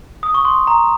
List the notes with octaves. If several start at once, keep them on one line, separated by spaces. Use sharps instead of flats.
D#6
C#6
C6
A#5